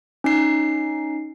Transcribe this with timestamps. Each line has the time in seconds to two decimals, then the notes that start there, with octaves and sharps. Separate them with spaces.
0.24 C#4 D#4 C7